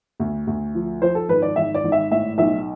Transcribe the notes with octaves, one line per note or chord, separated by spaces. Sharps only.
D2
D2
F3
F3 C5
A4
G#1 B4
D5
G#1 E5
D5
G#1
E5
A2 E5
B1 E5